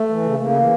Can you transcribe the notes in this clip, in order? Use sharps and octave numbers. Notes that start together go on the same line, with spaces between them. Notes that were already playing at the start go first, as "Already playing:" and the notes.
Already playing: A3
E3
C#3
C#3 A#3
E3